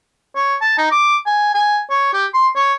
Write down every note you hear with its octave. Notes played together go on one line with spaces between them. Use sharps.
C#5
A5
D#4
D6
G#5
G#5
C#5
G4
C6
C#5